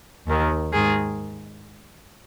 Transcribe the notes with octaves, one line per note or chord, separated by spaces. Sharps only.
D#2 D#3
G#2 D#3 G#4